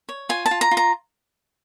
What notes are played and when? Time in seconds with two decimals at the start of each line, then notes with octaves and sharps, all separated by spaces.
0.09 C#5
0.29 F4 G#5
0.46 A5
0.51 F4
0.61 A#5
0.71 F4
0.77 A#5